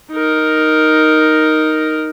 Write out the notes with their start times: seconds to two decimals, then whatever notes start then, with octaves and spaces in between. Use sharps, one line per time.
0.12 D#4 A#4